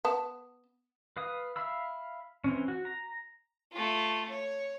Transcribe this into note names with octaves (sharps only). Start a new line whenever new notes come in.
B3 A5
B4 F5 D#6
E5 F5 B5 E6
E3 C4 C#4
F#4
A#5
A3 F4
C#5